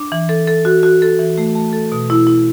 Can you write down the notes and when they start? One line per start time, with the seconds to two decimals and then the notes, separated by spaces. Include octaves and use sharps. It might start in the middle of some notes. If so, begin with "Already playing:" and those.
Already playing: D4
0.12 E3
0.29 A4
0.47 A4
0.65 F#4
0.83 F#4
1.02 A4
1.19 E3
1.38 A3
1.55 A3
1.73 A4
1.92 B2
2.10 E4
2.27 E4